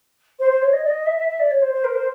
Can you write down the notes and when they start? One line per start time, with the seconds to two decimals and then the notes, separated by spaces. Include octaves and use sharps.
0.39 C5
0.51 C5
0.62 C#5
0.73 D#5
0.85 D5
0.90 D#5
1.06 E5
1.17 E5
1.28 E5
1.40 D5
1.51 C#5
1.62 C5
1.73 C5
1.84 A#4
1.95 C5